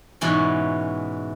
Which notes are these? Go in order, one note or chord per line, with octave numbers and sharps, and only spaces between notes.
G#2 B2 E3 C#4